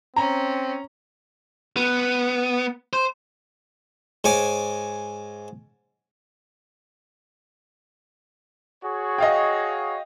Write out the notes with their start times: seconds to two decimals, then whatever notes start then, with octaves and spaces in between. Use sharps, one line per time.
0.16 C4 C#4 A#5
1.77 B3
2.93 C5
4.24 G#2 C#5 G#5 D6
8.84 F#4 G#4 C#5
9.18 D#5 F5 G5